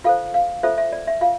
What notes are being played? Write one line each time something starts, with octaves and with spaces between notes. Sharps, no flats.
F4 A4 C5 F5
F5
F4 A4 C5 E5
E5
D5
E5
F4 F5